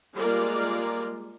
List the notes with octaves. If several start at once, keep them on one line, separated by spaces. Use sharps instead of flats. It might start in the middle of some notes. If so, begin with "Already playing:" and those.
G3 G#3 A#3 F4 A#4 D5